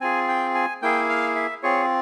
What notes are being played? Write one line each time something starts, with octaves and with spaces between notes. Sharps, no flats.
C4 F4 G#4 G#5
G5
G#5
A#3 E4 G#4 G5
F5
E5
C4 F4 G#4 C#5